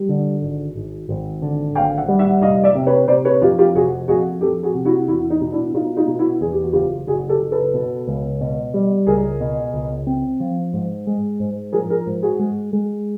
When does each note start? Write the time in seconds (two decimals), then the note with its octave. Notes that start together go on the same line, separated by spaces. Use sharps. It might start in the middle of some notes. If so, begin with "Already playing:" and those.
Already playing: G3
0.09 D3
0.42 G#1
0.76 G#1
1.09 G#1
1.42 D3
1.75 G#1 F5 G5
1.97 E5 F#5
2.08 G3
2.19 E5 F#5
2.42 F1 D#5 F5
2.63 D5 E5
2.75 C3
2.86 B4 C#5
3.08 C3 C5 D5
3.25 B4 C#5
3.42 F2 F4 G4
3.58 F4 G4
3.75 F1 F#4 G#4
4.08 F2 F#4 G#4
4.41 F2 G4 A4
4.63 F#4 G#4
4.75 C3
4.85 E4 F#4
5.08 E2 E4 F#4
5.30 D#4
5.41 B2
5.52 D4 E4
5.74 B2 D#4 F4
5.97 D#4 F4
6.08 B2
6.19 E4 F#4
6.41 E2 G#4
6.52 G4
6.62 F#4
6.73 F#1 F4 G4
7.07 F#1 F#4 G#4
7.29 G4 A4
7.41 F#1
7.52 A4 B4
7.74 B2
8.07 C#2
8.41 B2
8.74 G3
9.07 C#2 G#4 A#4
9.41 B2
9.74 C#2
10.07 C4
10.40 F3
10.73 G#2
11.07 G#3
11.40 G#2
11.73 F3 G#4 A#4
11.90 G#4 A#4
12.07 G#2
12.23 F#4 G#4
12.39 G#3
12.73 G#3